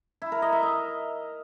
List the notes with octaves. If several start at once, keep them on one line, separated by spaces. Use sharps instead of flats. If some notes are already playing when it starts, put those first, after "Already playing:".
E4
A#4
D#5
E5
D#5